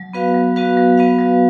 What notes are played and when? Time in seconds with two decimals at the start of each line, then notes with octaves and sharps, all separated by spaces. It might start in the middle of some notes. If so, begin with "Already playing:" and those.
Already playing: F#3
0.13 B3 F#4 B4 F5
0.34 F#3
0.56 B3 F#4 B4 F5
0.77 F#3
0.98 B3 F#4 B4 F5
1.19 F#3